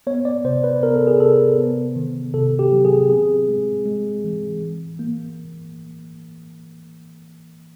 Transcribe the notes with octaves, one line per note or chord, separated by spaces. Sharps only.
B3 C#5
D5
C3 C5
B4
B3 A#4
A4
G#4
C3 A4
B3
D#3
C3 A4
G4
F#3
G#4
C4 G#4
G#3
G#3
E3
E3
A#3